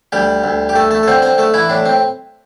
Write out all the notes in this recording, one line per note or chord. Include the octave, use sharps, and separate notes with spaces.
D2 G3 G4
D2
G4
A3 A4
A3 A4
A4
D3 C4 C5
C4 C5
A3 A4
E3 E4
A2 D4
C4